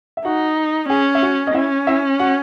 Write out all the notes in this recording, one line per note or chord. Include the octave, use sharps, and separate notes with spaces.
E5
D#4 F#4 F#5
C#4 G#4 G#5
E5
F#4 F#5
D#5
C#4 E4 E5
E4 E5
F#4 F#5